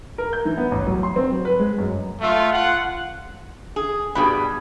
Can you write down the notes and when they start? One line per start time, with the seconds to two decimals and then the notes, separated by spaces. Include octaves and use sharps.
0.18 A#4
0.33 G6
0.45 E3
0.58 B3
0.72 A1
0.86 F#3
1.03 C6
1.16 C4
1.31 F#3
1.45 B4
1.59 G#3
1.78 F#2
2.21 A3 F4 E5
2.52 F4 F#5
3.76 G#4
4.15 G2 B2 G3 G#4 B5